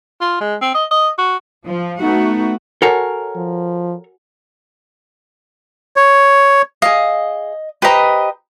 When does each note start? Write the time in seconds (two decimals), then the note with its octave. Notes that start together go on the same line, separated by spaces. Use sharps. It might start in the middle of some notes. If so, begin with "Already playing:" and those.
0.21 F4
0.41 G#3
0.61 C4
0.75 D#5
0.91 D#5
1.18 F#4
1.66 F3
2.00 A3 B3 D#4 F#4
2.82 F#4 A4 A#4 C#5 F#5 G#5
3.36 F3
5.96 C#5
6.82 G#4 D#5 F5
7.82 G4 B4 C5 D#5 A#5